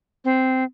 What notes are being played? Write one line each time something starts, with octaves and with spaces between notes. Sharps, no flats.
C4